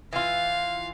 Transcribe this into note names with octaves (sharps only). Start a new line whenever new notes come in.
E3 F4 F5